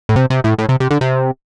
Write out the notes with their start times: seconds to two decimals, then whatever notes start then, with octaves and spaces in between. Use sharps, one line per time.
0.09 A2
0.16 C3
0.30 C3
0.44 A2
0.58 A2
0.69 C3
0.80 C3
0.91 D3
1.01 C3